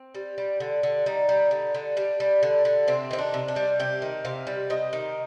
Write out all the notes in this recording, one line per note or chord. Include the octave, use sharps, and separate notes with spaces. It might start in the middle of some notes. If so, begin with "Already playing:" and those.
Already playing: C4
G3
G3
D3
D3
G3 D#4
G3
D3
D3
G3 D4
G3
D3
D3
C3 C4
D#3 C4
D4
C3
D4
G3
C3 G4
D#3
C3 F5
G3
C3 D#5
D#3